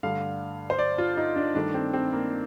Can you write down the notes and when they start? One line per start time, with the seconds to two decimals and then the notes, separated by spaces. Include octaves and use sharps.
0.03 G2 D3 A3 F5
0.70 C5
0.79 D5
0.98 F4
1.17 D#4
1.36 D4
1.55 G2 D#3 A3 D4
1.74 C4
1.93 C4
2.12 A#3